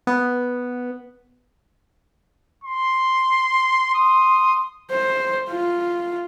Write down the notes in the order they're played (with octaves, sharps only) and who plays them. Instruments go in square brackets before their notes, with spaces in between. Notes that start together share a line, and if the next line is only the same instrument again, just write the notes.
[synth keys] B3
[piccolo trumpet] C6
[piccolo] C6 [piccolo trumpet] D#6
[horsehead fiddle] C5
F4